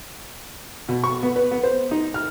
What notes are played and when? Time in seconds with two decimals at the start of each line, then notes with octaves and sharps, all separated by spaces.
0.89 B2
1.04 C#6
1.23 B3
1.36 B4
1.51 B3
1.63 C5
1.91 D#4
2.14 F6